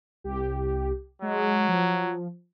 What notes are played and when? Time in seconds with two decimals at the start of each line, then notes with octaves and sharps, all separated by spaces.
0.24 C2 G4
1.22 F#3 G#3
1.68 F3